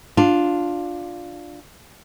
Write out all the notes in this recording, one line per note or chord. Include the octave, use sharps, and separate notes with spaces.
D4 F4